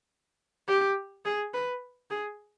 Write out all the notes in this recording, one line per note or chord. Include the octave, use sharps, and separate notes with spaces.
G4
G#4
B4
G#4